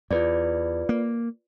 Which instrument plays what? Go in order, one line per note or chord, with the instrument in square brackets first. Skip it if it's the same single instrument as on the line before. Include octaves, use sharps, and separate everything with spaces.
[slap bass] E2 [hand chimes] F4 B4 D5
[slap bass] A#3